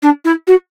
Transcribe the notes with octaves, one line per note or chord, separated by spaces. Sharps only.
D4
E4
F#4